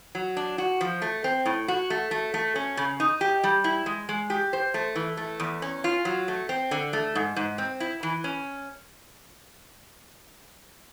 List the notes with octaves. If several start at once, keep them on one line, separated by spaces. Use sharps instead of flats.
F#3
D4
F#4
F3
A3
C4
A2
F#4
A3
A3
A3
C#4
C#3
D#4
G4
G3
E4
G#3
G#3
G4
C5
A3
E3
A3
E2
C#4
F4
F#3
A3
C4
D3
A3
G#2
G#2
C4
E4
E3
C#4